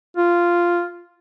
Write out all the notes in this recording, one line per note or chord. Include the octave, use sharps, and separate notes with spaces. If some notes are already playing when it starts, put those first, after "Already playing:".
F4